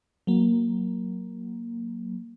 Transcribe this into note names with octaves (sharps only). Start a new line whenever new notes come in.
F#3 A#3